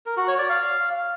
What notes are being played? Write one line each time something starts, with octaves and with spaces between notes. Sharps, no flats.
A#4
F#4
C#5
D5
F5